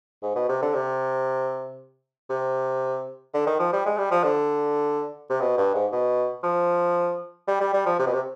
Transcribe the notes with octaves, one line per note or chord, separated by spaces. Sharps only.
G#2
B2
C3
D3
C3
C3
D3
D#3
F3
G3
G#3
G3
F3
D3
C3
B2
G2
G#2
B2
F3
G3
G3
G3
F3
C3
B2
C3